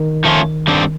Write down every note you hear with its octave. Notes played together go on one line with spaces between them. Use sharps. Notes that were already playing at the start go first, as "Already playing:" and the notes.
Already playing: D#3
F3 A3 C#4 F4
G2 D3 G3 C4